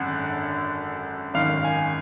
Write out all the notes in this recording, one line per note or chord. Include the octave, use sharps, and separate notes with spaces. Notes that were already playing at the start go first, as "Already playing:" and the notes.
Already playing: G#1 F#2 D3 F#5
G#1 F#2 D#3 F5
G#5